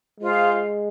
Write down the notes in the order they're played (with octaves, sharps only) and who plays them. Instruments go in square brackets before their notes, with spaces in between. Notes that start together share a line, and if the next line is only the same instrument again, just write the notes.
[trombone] G#3 [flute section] F4 G#4 C5 F5